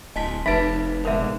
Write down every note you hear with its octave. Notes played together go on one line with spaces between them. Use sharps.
D1 D#5 G#5 A5 C6 B6
F1 D#4 B4 E5 A5 B5 D7
G#2 B2 D3 A#4 E5